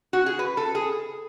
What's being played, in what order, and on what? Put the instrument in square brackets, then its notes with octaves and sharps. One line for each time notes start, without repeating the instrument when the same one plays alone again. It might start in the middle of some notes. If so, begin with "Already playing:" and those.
[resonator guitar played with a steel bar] F#4
G#4
B4
A4
G#4